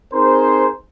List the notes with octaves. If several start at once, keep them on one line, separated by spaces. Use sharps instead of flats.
C4 D#4 G#4 A#4 C5